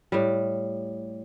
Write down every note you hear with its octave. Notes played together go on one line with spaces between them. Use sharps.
A2 G3